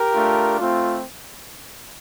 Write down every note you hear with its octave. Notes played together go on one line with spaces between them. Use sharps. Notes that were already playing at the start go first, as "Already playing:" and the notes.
Already playing: G4 A#4
A3 D4 F4
A3 C4 F4